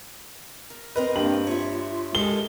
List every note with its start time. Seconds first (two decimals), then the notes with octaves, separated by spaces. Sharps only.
0.70 A#4
0.96 C4 A#4 B4 D#5
1.15 G2 A#3 G4 F#7
1.47 F4 C#5 E5
1.91 F4
2.15 G#3 G4 A4 A#4 G7